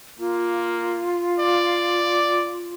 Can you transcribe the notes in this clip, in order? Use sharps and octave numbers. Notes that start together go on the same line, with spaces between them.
A#3 F4
D5